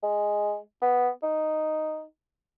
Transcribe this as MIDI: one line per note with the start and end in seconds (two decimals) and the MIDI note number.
0.03 0.57 56
0.82 1.09 59
1.23 2.04 63